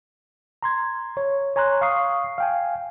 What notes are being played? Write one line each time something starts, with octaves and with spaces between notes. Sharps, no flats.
A#5 C6 G#6
C#5
C#5 G#5 A#5 C6 F#6
F5 C#6 D#6 C7
F5 G5 G#5